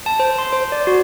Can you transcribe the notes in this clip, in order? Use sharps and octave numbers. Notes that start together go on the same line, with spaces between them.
A5
C5
C6
C5
D5
F#4